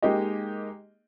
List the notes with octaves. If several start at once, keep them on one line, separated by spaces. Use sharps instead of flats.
G#3 A#3 D#4 G4 D#5